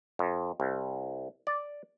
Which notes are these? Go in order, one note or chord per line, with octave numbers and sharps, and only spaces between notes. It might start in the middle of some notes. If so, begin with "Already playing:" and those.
F2
C2
D5